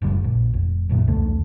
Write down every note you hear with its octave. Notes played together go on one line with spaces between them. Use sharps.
F#1 D2 G3
A#1
F1
D#1 B1 F#2 A#2
E1 C2 D3 A3